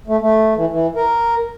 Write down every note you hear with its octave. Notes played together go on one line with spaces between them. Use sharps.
A3
A3
E3
E3
A#4